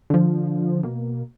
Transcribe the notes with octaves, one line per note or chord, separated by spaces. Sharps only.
D3 F3
B2 A#3